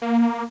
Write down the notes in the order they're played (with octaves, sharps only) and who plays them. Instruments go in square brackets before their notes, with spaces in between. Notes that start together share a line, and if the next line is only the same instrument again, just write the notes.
[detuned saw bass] A#3